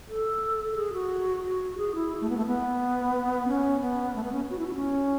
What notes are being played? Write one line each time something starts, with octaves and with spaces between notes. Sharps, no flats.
A4
A4
G#4
F#4
F#4
G#4
E4
A3
B3
A3
B3
C#4
B3
A3
B3
C#4
F#4
E4
F#4
C#4